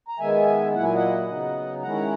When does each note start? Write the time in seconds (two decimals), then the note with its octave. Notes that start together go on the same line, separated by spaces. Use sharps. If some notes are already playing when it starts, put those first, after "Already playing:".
0.08 A#5
0.19 D#3 G#3 B3 E5 G#5
0.74 A#2 F#3 A#3 E4 F#5
0.84 G#5
0.94 D#5 F#5
1.28 C#3 F#3 B3 D#4
1.83 D#3 G#3 C#4 E4 F#5 A#5